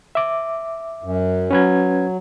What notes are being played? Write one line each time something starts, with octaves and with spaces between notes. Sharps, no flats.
E5 D6
F#2
F#3 C#4 B4 G#6